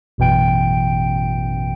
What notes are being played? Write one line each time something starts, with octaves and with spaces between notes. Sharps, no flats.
A1 F#2 B2 E3 G5 D7